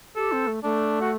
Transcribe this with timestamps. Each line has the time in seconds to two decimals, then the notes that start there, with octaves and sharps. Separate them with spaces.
0.16 G4 A4
0.32 C4
0.47 A3
0.64 A3 D4
1.01 F#4